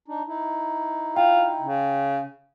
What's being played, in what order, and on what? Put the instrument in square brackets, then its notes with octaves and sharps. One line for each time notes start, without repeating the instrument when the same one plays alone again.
[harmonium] D4 D#4
D#4 E4
[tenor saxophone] F4 [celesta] G5
[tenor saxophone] C#3